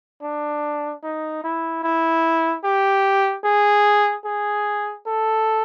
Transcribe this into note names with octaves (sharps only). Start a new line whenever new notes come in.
D4
D#4
E4
E4
G4
G#4
G#4
A4